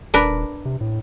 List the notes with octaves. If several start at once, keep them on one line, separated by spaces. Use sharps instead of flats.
D#1 D4 A#4 B4
C3
A2